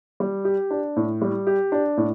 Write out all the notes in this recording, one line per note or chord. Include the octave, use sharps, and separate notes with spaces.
G3
G4
D4
A2
G3
G4
D4
A2